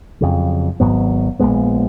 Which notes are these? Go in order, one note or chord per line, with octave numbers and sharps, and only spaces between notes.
F2 C#3 F#3
G#1 G#2 F#3 B3
A#1 A#2 G#3 B3